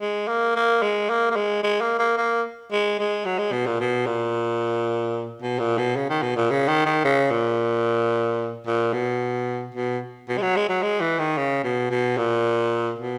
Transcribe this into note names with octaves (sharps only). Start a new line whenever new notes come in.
G#3
A#3
A#3
G#3
A#3
A#3
G#3
G#3
A#3
A#3
A#3
G#3
G#3
F#3
G#3
B2
A#2
B2
A#2
B2
A#2
B2
C#3
D#3
B2
A#2
C#3
D#3
D#3
C#3
A#2
A#2
B2
B2
B2
G#3
F#3
G#3
F#3
G#3
E3
D#3
C#3
B2
B2
A#2
B2